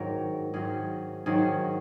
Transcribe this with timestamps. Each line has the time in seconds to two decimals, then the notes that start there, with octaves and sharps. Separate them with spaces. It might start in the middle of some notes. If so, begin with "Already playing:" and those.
Already playing: G#2 D#3 F#3 A#4
0.54 G#2 D#3 F#3 G#4
1.26 G#2 D#3 F#3 G#4